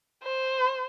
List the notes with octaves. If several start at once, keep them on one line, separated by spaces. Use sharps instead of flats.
C5